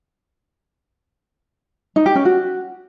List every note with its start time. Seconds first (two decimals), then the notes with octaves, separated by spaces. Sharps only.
1.96 D#4
2.06 G4
2.16 C#4
2.25 F#4